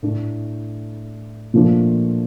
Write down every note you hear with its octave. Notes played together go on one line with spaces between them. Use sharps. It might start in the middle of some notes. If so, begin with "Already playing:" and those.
A2 A3 D4
A#2 F3 A3 D4